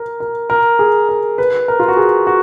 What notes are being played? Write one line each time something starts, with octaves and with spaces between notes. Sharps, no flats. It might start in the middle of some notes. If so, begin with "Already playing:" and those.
Already playing: A#4
A#4
A#4
G#4
A#4
B4
A#4
F4
F#4
G#4
F#4